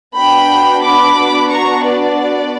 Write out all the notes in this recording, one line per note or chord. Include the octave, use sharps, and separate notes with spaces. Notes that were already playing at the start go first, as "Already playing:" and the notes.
B3 D4 F#4 G5 B5
B5 D6
A#5 C#6
B4 D5